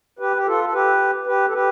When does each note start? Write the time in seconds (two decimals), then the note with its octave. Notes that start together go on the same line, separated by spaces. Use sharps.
0.19 G4 B4
0.36 G4
0.46 F4 A4
0.64 A4
0.73 G4 B4
1.27 G4 B4
1.48 A4
1.54 G4 B4